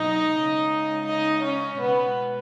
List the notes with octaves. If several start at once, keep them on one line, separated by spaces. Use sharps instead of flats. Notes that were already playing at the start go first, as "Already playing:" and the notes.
Already playing: B2 F#3 A#3 D#4 D#5
C#3 G#3
D#4 D#5
C#4 C#5
B2 G#3 B3 B4